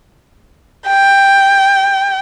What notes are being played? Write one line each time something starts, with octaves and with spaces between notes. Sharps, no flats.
G5